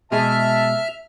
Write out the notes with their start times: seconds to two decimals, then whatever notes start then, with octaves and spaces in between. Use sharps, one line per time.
0.12 B2 G#3 G#4 E5 A5 F6